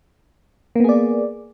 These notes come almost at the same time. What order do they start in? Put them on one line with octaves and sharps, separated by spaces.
A#3 B3 G#4 D5